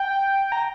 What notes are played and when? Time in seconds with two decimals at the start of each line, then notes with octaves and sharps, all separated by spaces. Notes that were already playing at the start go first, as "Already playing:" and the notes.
Already playing: G5
0.52 A#5